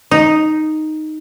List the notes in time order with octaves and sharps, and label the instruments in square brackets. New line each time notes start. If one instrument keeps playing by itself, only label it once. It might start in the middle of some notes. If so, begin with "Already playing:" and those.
[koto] D#4